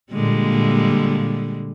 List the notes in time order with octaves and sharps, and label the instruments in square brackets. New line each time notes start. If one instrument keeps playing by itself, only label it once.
[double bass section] A#2 [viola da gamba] D3 G3 G#3